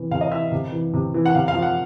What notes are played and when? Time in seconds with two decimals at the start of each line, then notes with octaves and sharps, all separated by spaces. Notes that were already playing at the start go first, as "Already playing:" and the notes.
Already playing: C3 E3
0.11 C3 F5
0.21 D#5
0.31 E3 E5
0.52 C3
0.72 E3
0.94 C3
1.14 E3
1.25 F#5
1.35 C3 F5
1.48 F5
1.55 F3
1.62 F#5